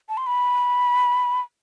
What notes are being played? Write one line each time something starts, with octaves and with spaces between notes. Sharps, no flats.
A5
C6
B5